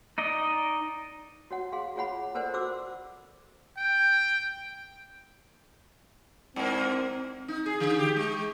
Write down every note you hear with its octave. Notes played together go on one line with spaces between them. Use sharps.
D#4 D5 D#5
F#4 C#5 F#5
G#4 F5 C6
F4 G#4 C#5 F#5 B5
A4 A#4 C5 D5 F#5
F#4 C5 D6 E6
G5
G2 A#3 C4
D#4
G#4
D3
G4
G#3